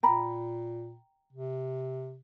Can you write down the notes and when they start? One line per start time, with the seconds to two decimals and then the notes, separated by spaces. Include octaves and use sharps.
0.03 A#2 G5 A#5 B5
1.32 C3